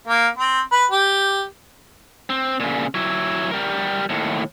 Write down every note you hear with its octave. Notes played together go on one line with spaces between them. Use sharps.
A#3
C4
B4
G4
C4
A#2 C#3
F#3 E4
G3 A#4
D#2 A2